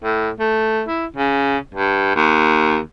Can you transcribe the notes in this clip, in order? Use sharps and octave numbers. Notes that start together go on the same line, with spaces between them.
A2
A3
E4
C#3
G2
D#2